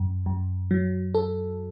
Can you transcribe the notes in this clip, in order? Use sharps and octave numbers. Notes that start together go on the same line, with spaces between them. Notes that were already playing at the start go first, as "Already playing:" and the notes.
Already playing: F#2
F#2
F#3
A4